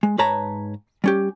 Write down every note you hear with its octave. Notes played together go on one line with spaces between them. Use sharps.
G#3
G#2 B4 C#5 A5 A#5
G3 C#4 G4